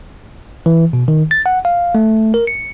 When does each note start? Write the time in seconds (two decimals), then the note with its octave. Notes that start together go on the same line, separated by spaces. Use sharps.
0.66 E3
0.93 B2
1.08 D#3
1.31 A6
1.46 F#5
1.65 F5
1.95 A3
2.34 A#4
2.47 C#7